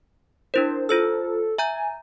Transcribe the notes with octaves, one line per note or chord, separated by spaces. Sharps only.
D4 E4 A#4 C5
F4 A4 C5 E6
E5 G#5 A#5 G6